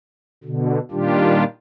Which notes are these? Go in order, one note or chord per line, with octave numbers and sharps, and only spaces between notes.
B2 D3
A#2 D#3 G3 D4 F4 G4